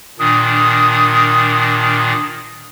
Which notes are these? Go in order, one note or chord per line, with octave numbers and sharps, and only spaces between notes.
A#2 D#3 D4 D#6